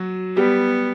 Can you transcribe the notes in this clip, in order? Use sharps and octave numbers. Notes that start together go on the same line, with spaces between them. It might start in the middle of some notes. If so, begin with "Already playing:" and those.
Already playing: F#3 F#4
G3 B3 G4